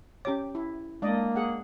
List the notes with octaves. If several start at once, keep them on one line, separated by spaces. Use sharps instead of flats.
C#4 G4 C#5 D6
E4
G#3 A#3 D4 D5 D#5
G#4 F#5